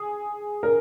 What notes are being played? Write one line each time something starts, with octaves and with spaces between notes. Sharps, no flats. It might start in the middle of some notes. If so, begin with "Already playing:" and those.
Already playing: G#4
A#4